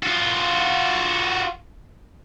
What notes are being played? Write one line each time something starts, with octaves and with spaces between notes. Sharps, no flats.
F4 F#4